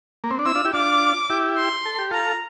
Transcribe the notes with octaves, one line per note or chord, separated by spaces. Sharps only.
A#3
C4
D4
C4 E4 E6
D4 F4
E4 G4
D4 F4 D6
E4 G4
C6
A4
G4
F4 A4 A#5